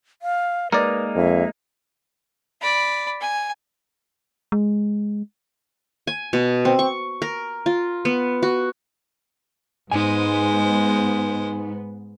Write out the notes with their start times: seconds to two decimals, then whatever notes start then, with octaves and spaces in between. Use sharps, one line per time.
0.22 F5
0.72 G#3 A#3 D#4 A#4 B4 D5
1.16 F2 E5
2.61 D5 B5
3.21 G#5
4.52 G#3
6.07 G#5
6.33 B2
6.65 C4
6.79 C#6
7.22 A#4
7.66 F4
8.05 B3
8.43 F#4
9.92 G#2 G#3 B3 D#4 C5 G#5